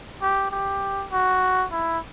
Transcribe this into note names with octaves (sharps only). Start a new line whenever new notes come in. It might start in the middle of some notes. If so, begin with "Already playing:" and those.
G4
G4
F#4
E4